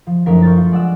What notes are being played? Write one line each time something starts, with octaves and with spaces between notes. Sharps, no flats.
F3
F#1 F3 A3 D4 A#4 B6
C#6 F6 G6 A6
F4
G#3 D5 F#5 E6